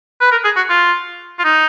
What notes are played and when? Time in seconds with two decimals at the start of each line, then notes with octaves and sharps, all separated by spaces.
0.20 B4
0.31 A#4
0.44 G#4
0.56 F#4
0.69 F4
1.39 F4
1.44 D#4